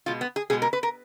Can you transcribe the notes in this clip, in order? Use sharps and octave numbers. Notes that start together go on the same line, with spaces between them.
B2 G#3 F4
B3
G#4
B2 G#3 G#4
A#4
B4
A#4